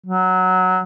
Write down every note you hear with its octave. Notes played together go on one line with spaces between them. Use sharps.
F#3